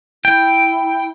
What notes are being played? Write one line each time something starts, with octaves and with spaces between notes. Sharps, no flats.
E4 G5